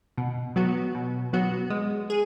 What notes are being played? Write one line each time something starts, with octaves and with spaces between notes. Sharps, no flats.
B2
F#3 B3 F#4
B2
F#3 B3 F#4
G#3
G#4